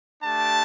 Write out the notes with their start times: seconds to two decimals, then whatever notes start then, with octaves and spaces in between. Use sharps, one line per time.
0.21 A3 D4 G4 A5